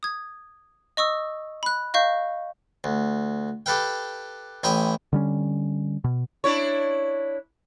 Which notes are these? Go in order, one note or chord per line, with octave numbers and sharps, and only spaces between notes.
D#6 G#6
D#5 C#6 D#6 E6
B5 F#6
D#5 F5 C#6 G6
D2
G4 A4 B4 F5 G5
A1 E4 G5 A#5 D#6
D3 G3 C#4
B2
D4 E4 C#5